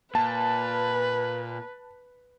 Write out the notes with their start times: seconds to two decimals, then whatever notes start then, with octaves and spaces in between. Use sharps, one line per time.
0.15 A#2 B4 A5